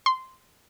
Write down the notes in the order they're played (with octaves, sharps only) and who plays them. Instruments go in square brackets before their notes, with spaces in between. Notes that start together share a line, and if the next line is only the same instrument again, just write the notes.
[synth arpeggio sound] C6